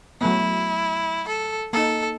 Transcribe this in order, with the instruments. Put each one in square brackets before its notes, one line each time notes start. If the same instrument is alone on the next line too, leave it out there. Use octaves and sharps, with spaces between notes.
[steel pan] F#3 A3 B3 [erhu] E4
[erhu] A4
[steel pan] A#3 D#4 [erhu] A4